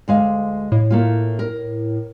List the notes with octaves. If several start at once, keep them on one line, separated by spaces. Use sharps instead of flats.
D2 G#3 F5
A2
A3 A#3 F4
A#4